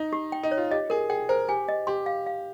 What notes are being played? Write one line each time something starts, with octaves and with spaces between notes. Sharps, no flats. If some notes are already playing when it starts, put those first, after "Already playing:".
Already playing: D#4
G4
G5
D#4
C#5
F4
G4 D#5
G#4 A#4
G#4 G5
A#4 C5
G4 G#5
D#5
G4 C6
F5
F5